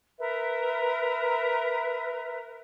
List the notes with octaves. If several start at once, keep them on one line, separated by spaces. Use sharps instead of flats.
A#4 B4 E5